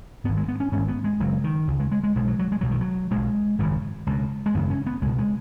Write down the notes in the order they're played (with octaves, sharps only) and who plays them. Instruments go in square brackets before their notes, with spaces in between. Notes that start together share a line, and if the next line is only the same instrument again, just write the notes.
[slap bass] G#1 G#2 B3
G#3
B3
C#4
G#1 G#2 C#4
B3
G#3
F#1 F#2 C#3 F#3
D#3
C#2 C#3
G#3
G#3
G#3
B1 B2 G#3
F#3
F#3
G#3
B1 B2 F#3
D#3
F#3
B1 B2 G#3
G#1 F#2 C#3
C#2 B2
G#3
G#1 F#2 C#3 B3
C#4
B3
C#2 B2 G#3
G#3